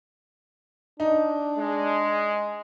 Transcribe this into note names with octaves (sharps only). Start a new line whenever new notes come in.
D4 D#4
G#3